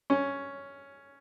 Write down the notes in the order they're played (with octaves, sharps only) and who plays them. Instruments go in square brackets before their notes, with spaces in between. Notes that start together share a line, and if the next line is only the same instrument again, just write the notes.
[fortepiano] C#4